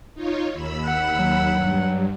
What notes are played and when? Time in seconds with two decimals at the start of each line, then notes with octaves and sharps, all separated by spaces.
0.14 D#4 F4 C#5
0.53 D#2 B5 E6
0.85 F#5
1.19 F#3
1.51 G2